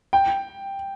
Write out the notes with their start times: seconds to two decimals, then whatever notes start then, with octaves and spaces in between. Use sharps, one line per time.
0.13 G5